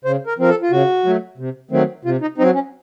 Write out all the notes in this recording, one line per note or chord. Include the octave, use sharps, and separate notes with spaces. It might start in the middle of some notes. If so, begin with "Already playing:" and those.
C#3 C5
A#4
F3 C4 A#4
A4
F4
C#3 F#4
F#3 A3
C3
D#3 F#3 A3 C4
C3 F4
D#4
F#3 C4 D#4
C#4